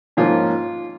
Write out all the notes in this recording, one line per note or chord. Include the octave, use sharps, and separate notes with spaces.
G#2 F3 A#3 C#4 F4